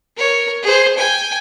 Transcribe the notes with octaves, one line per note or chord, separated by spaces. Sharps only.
A#4 C#5
G#4 C5
G5 G#5